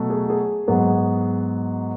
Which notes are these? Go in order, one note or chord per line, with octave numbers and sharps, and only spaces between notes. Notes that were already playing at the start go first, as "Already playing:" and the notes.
Already playing: B2 F#3 A3
G#4
G#4
G#2 F#3 B3